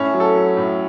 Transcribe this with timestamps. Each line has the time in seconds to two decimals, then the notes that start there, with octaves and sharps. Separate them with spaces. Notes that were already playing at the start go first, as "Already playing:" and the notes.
Already playing: A2 C#4
0.13 F#3
0.20 A4
0.35 F#3
0.57 A2